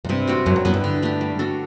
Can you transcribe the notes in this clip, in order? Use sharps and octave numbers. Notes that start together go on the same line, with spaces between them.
F#2
G2 C3
G3 C4 F#4
F#2 F#3
G2
F#2 B3 E4 B4
G2
D3
A3 D4 G4
G3
D4 F#4 A4